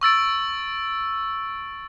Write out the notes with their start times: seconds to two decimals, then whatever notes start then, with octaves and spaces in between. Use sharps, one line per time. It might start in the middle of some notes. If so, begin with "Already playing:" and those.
0.01 C#6 E6 A6 D7